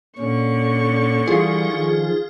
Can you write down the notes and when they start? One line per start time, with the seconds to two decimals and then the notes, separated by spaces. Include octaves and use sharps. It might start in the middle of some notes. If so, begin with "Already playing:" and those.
0.18 A#2 D3 C#4 C#6
1.28 E3 G3 F4 G#4
1.73 D#3 F3